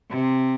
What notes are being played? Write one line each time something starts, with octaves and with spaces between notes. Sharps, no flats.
C3